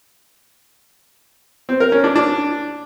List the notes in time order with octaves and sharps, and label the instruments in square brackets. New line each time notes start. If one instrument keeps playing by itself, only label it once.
[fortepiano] C4
A#4
C#4
D4
D4